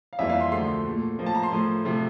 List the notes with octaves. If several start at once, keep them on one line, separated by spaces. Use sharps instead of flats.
F5
F2 E3 G3 A#3 E5
F5
C6
D2 D3 F3 A3 C6
A#2 A3
A2 F3 A#3
A5
A#5
C6
A2 F3 A3
C3 F3 A3